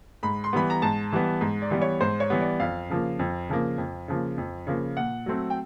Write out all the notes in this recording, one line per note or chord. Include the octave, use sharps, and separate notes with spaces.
G#2 B5
C6
E3 G3 B3 B5
A#5
G#2 A5
E3 G3 B3
G#2
D5
E3 G3 B3
C#5
G#2 C5
C#5
E3 G3 B3
D5
F2 F5
C#3 F3 A#3
F2
C#3 F3 A#3
F2
C#3 F3 A#3
F2
C#3 F3 A#3
A#2 F#5
F#3 A3 C4
G5